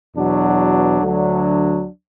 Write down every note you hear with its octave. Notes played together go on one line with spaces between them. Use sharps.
E2 B2 F#3 D4
D2 D3 F#3 D4